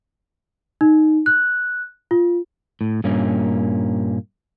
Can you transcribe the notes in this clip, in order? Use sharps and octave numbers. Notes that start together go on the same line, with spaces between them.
D#4
F#6
F4
A2
G2 A#2 A#3 C#4